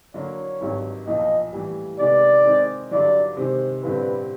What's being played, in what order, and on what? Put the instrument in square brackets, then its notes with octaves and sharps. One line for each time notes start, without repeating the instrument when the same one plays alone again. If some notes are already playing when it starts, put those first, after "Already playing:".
[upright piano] D3 F#3 A#3 [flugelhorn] C#5
[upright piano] G#1 G2 D#3 F#3
[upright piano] B1 A#2 F3 [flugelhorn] D#5
[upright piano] A2 E3 G3
[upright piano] C3 D#3 G#3 B3 [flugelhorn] D5
[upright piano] D#3 G#3 C4 D#4 G#4
[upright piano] G2 D3 F#3 [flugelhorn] D5
[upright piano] C3 D#3 G#3 [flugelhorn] C5
[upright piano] A1 G2 D3 G3 C4 [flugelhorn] B4